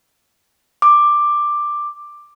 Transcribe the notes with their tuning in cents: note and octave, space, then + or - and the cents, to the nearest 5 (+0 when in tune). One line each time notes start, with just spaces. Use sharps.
D6 +10